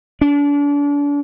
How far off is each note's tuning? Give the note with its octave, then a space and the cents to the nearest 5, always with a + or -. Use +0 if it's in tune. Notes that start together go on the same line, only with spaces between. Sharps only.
D4 -35